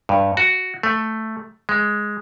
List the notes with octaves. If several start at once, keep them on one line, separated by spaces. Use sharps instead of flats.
G2
F#4
A3
G#3